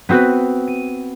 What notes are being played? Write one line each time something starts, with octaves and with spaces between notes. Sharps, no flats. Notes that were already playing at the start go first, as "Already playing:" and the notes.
B3 C4 F#4 B4
D#7